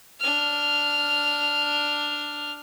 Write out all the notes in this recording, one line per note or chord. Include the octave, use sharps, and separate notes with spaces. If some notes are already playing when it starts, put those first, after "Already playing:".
D4 F6